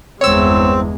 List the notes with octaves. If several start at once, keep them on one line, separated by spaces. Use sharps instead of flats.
G1 E2 G#3 C4 C#5 E6